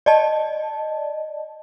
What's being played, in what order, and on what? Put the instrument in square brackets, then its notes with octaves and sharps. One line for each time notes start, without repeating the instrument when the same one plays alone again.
[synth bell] D5 D#5 A5